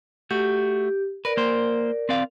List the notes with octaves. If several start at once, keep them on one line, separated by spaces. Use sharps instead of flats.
A3 F#4 G4
A#4 B4 D5
A#3 C5
C4 D5 F5